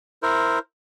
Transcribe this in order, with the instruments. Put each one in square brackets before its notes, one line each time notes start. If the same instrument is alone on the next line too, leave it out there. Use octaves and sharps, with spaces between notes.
[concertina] E4 A#4 C5